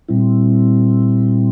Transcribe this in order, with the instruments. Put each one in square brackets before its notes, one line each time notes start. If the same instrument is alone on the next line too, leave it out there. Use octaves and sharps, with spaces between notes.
[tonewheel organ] A#2 G3 C4 E4